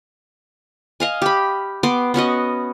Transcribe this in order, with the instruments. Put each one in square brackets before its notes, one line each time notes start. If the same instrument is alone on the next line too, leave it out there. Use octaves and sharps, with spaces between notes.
[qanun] D#5 F5 G#5
G4 B5
B3 C6 D6
B3 C#4 F#4 D#5